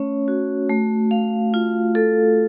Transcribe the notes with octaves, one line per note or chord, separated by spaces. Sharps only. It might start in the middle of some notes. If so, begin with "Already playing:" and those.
Already playing: A3 C#4 C#5
F#4
A3
F5
F4
A4